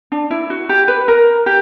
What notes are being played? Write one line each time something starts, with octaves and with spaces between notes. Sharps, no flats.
D4
E4
F#4
G4
B4
A#4
G4